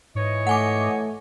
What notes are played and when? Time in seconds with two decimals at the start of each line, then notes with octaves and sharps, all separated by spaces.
0.15 G#2 E3 C#5 D#5
0.47 A3 F#5 G#5 D6